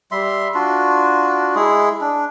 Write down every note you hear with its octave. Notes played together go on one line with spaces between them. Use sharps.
G3 E5 C6
D4 F4 F#4
G#3 E4 G#4
D4